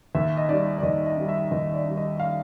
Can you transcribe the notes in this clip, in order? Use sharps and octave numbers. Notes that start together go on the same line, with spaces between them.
D#2 E5
D#5
D#3 G3 D5
D5
D#2 D#5
D#5
D#3 G3
E5
D#2 D#5
D5
D#3 G3
D#5
F5